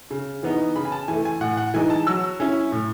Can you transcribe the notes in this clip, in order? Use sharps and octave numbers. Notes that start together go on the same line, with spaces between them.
C#3
E3 B3 D#4
C#3 B5
G#5
A5
E3 A3 G#5
G#5
A2 F#5
F#5
E3 G#3 D#4 G#5
A5
F#3 E6
C#4 E4
A2